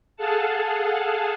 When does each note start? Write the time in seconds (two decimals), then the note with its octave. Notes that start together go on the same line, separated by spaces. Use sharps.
0.17 G#4 A4 F5 F#5 A5